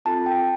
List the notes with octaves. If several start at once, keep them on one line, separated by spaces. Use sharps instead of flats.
C4 F4 A4 A5
G5